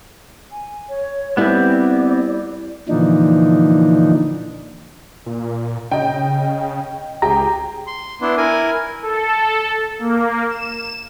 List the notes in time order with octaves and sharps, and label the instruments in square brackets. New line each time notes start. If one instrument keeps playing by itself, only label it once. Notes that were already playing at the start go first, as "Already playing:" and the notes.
[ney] G#5
C#5
[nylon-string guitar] G3 E4 [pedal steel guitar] B3 C4 [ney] D5
[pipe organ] A#2 D3 E3 F3 D4 D#4
[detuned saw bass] A#2
[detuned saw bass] C#3 [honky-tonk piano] D#5 G5
[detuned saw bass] C#2 [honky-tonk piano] G4 G#4 G5 [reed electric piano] A#5
[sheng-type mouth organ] C6
B3 D4 E4 C6
E4 A#4 G#5
[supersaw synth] A4
A#3
E7